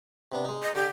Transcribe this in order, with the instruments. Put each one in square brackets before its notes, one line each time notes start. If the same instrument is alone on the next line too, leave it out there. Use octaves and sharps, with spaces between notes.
[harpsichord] C3 B3 D4
G#3 D#4
[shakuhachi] D#5
[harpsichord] D3 [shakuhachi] G4